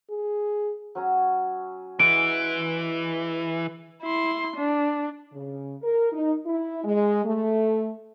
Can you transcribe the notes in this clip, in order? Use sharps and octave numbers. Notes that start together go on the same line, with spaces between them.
G#4
F#3 C#4 A#5
E3 G#3 D7
E4 C6
D4
C#3
A#4
D#4
E4
G#3
A3